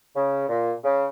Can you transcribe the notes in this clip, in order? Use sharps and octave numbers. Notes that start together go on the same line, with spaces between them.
C#3
A#2
C#3